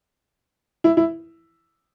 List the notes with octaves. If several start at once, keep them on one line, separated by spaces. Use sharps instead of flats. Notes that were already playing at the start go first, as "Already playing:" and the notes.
E4
E4